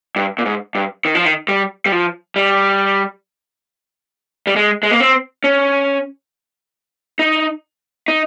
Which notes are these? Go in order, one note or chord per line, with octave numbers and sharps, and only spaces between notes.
G2
A#2
G#2
G2
D#3
F3
D#3
G3
G3
F3
G3
G3
G#3
G#3
A#3
C4
C#4
D#4
D#4